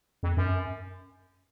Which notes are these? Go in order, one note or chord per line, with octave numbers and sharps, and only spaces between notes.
F2
F#2